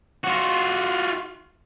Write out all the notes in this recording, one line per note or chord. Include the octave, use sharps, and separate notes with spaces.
F4 F#4